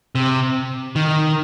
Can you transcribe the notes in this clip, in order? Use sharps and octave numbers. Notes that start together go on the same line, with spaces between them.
C3
D#3